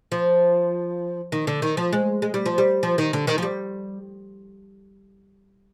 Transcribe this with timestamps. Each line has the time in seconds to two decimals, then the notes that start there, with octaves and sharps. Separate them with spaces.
0.12 F3
1.32 D#3
1.47 D3
1.62 D#3
1.77 F3
1.93 G#3
2.22 G#3
2.34 G3
2.46 F3
2.58 G3
2.83 F3
2.98 D#3
3.13 D3
3.27 D#3
3.38 F3
3.42 G3